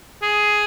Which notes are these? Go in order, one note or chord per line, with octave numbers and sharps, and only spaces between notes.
G#4